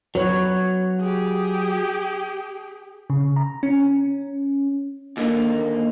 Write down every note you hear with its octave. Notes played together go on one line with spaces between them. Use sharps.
F#3 B4 C#5
G4 G#4
C#3
A#5
C#4
D#2 D3 A#3